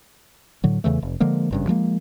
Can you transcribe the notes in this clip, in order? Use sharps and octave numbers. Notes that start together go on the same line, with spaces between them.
A2 D3 F#3
E2 C#3 E3 A3
F1
D3 F3 G#3 A#3
G#1 G2 C#3
F3 G#3 A#3